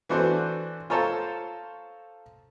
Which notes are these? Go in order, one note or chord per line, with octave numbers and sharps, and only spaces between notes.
E3 B3 D4 F#4 A4 C5
F4 A4 C5 C#5 A5 A#5